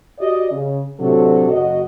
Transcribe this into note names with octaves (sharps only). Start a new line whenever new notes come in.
F#4 G4 D5 D#5
C#3
A2 C3 F#3 D4 F#4 A4
F#1 F#4 D#5